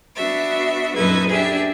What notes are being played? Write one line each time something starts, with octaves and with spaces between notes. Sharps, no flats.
B3 D4 F#4 E5
F#2 A#2 D#4 A4 B4 G#6
D4 G4 G#4 E5